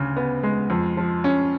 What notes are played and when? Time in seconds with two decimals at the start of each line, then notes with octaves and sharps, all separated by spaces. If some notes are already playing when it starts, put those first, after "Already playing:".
Already playing: D2 C#3
0.17 B3
0.43 G#3
0.70 F2
0.97 F3
1.24 C#4